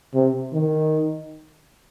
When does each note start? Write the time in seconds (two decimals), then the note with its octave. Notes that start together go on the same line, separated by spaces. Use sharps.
0.14 C3
0.53 D#3